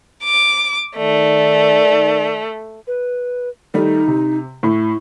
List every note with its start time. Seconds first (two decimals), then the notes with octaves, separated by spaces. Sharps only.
0.24 D6
0.97 D#3 A3 D5
2.87 B4
3.74 D#3 G3 A3 D#4
4.08 C3
4.63 A2 E4